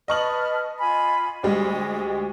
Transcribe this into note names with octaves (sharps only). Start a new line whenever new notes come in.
B4 D#5 A5 C#6 F6 F#7
F4 G#5 B5
D2 G3 G#3 D#5